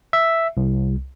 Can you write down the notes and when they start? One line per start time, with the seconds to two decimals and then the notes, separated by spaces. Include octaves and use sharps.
0.13 E5
0.57 C2